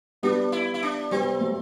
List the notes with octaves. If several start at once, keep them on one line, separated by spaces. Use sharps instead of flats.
G3 B3 D4
E4
E4
D4
G3 B3 C4
F#3 A3